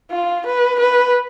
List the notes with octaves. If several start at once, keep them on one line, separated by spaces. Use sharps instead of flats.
F4
B4
B4